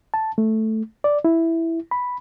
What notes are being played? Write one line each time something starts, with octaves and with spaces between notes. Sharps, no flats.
A5
A3
D5
E4
B5